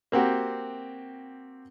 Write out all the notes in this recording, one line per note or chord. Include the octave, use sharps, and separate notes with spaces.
A#3 C4 F#4 G4